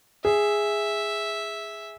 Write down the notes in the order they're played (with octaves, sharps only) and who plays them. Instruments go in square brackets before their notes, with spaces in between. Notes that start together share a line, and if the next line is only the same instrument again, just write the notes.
[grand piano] G#4 [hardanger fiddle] E5